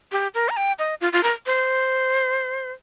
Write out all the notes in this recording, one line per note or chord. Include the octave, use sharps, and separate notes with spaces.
G4
A#4
A#5
G5
D#5
F4
F4
A#4
C5